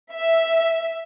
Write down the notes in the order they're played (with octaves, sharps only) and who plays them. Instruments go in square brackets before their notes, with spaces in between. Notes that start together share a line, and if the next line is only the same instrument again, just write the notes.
[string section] E5